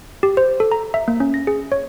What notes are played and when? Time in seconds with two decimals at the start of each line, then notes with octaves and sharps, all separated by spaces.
0.23 G4
0.37 C5
0.60 A4
0.72 A#5
0.94 E5
1.08 A#3
1.20 C#4
1.34 A#6
1.47 G#4
1.72 C#5